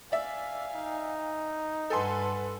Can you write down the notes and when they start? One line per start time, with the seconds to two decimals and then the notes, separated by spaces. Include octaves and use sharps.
0.12 D5 E5 F5 G#5
0.75 D#4
1.90 G2 A4 B4 F#5 G#5 A5 C6